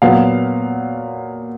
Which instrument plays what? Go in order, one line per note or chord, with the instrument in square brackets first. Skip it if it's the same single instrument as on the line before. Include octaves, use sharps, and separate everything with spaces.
[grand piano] A#2 F#3 B3 F5